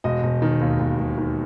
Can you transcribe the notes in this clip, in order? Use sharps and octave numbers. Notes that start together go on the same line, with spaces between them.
E1 D#5
E1
D#3
D#2
E1
E1
D#3